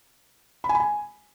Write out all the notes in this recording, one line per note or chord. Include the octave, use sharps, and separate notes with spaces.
B5
G#5
B5
G#5